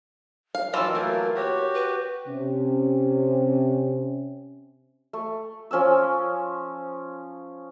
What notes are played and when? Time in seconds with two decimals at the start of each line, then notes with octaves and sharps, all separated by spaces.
0.55 F5
0.74 D#3 E3 F#3 F4 A5 E6
0.94 F#3 A3 A#3 A#4
1.35 F#4 G4 C#5
1.74 B4
2.27 C3 C#4
5.13 A3
5.71 F3 C#4 G#5 E6